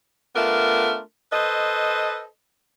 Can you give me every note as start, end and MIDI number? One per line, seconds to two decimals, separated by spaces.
0.35 1.00 57
0.35 1.00 59
0.35 1.00 62
0.35 1.00 65
0.35 1.00 70
1.32 2.23 69
1.32 2.23 71
1.32 2.23 72
1.32 2.23 75